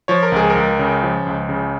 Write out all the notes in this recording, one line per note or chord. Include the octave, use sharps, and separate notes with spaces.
F3 C#5
A#4
C#2 G#4
A#4
C#2
C#3
F3
C#2
C#3